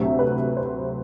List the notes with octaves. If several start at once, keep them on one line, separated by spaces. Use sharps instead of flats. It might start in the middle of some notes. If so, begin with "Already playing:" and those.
Already playing: D2 C3 F#3 A3 E5
B4
C5